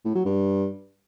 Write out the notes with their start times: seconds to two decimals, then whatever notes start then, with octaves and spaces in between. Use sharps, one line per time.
0.05 A2
0.15 F#3
0.25 G2